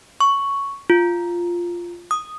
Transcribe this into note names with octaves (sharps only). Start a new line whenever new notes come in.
C#6
F4
D#6